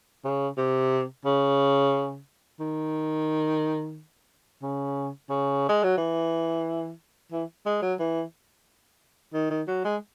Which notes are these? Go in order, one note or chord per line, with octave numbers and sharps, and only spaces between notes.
C#3
C3
C#3
D#3
C#3
C#3
G#3
F#3
E3
E3
G#3
F#3
E3
D#3
D#3
F#3
G#3